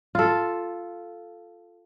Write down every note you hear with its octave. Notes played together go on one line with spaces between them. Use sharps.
F4 A4